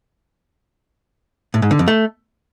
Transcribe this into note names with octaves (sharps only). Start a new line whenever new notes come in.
A2
G#2
D3
F2
A3